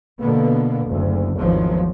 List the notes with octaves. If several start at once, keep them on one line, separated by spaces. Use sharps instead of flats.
B2 D3 A#3 B3
F#1 D2
G#1 E2 D#3 F3 F#3